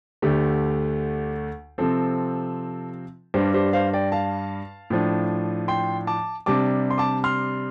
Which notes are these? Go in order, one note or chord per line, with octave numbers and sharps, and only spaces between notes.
D2 D3 A3 G4
C3 F3 C4 A4
G2 G3 D4 G4 C5
G4 C5
C5 F5
D5 G5
F5 A5
A2 F3 D4
G5 C6
A5 D6
C3 G3 D4 A5 D6
C6
A5 D6
C6 F6